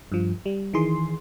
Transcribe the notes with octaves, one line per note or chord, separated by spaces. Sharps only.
G2 F3
G3
D#3 E3 G#4 C6